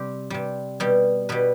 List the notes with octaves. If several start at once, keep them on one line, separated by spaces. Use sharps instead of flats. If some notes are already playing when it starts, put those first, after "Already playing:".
Already playing: C3 G3 G4
C3 G3
B2 G3
B2 G3 B4